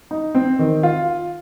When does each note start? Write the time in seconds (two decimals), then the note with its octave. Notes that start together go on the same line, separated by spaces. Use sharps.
0.11 D#4
0.35 C4
0.59 D#3
0.83 F4